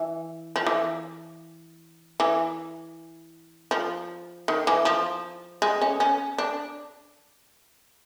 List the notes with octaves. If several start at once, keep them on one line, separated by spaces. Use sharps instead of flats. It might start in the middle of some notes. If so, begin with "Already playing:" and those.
Already playing: E3
F3
E3
E3
F3
D#3
E3
F3
G#3
C#4
C#4
D4